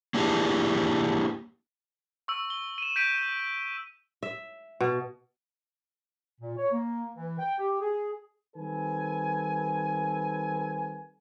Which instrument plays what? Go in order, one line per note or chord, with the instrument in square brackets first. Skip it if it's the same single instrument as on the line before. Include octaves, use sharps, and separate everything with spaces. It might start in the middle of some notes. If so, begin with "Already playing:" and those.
[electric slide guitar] A#3 D4 E4 G4 G#4
[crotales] C#6 E6
G7
D#7 E7
G6 B6 D7 D#7
[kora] E5
B2
[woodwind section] A#2
C#5
A#3
E3
G5
G4
G#4
[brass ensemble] D#3 G3 C4 A4 B4 G#5